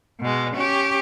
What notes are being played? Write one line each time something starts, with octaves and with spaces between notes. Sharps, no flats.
B2 G#3
C#4 G4